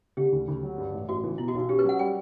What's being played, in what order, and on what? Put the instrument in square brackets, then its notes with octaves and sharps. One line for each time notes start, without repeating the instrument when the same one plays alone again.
[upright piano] D3 [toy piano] G4
[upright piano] D2
D2
F#3
G2
A1
[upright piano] A1 [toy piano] F#4
[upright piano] E3
[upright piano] B2 [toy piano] E4
[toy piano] F#4
[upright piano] B1
[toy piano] F#4
[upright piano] C#4 [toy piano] G4
[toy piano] B4
[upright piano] F#3 [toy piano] F#5
[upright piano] G3 [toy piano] G5